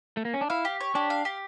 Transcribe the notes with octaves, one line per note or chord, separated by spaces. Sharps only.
A3
A#3
C#4
D4
E4 F5
G4
C#5
D4 G4
F5
G4